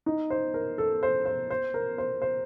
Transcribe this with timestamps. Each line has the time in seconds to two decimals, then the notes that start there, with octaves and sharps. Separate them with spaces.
0.06 D#4
0.30 C5
0.54 A#4
0.78 A4
1.03 C5
1.26 C5
1.50 C5
1.74 A#4
1.98 C5
2.22 C5